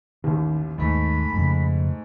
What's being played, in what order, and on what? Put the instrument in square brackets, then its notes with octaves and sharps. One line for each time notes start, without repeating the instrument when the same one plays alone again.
[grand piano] A1 D#2 [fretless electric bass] D#3
[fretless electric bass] D#2 [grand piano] G#2 A3 [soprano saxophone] B5
[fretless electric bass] F2 C#3